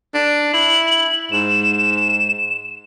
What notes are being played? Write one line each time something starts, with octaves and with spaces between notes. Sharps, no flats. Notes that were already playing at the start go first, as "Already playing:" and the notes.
D4
E4 F#7
G#2 E7